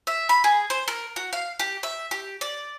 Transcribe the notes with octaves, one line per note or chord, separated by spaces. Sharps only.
E5
B5
G#4
C5
A#4
F#4
F5
G4
E5
G4
D5